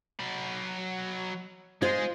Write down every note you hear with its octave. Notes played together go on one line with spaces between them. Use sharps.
F#3 B5
G#3 F4 G#4 C5